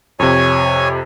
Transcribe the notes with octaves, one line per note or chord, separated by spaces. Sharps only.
F2 C3 C#5 G#5